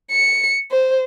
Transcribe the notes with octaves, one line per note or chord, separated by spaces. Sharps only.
C#7
C5